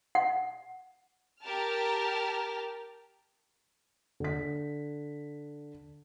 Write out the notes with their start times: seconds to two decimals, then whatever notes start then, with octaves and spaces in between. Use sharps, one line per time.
0.15 F#5
1.41 G4 A#4 A5 F6
4.20 D3 B6